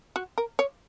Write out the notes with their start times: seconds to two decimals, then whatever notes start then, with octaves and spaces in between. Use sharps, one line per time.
0.16 F#4
0.38 A#4
0.59 C#5